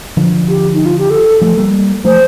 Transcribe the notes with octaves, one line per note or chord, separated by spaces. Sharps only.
D3 F3
G4
D#4
F4
G4
A4
F3 A3
G3 A#3
F3 A3 C5